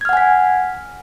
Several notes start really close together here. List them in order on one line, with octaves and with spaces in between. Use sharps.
G#6 F6 F#5 G#5 B6